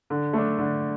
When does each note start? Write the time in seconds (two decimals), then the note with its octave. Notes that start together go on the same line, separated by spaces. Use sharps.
0.10 D3
0.33 A3 D4
0.58 D3